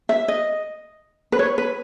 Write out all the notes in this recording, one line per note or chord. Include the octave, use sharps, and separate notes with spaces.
E5
D#5
B4
C#5
B4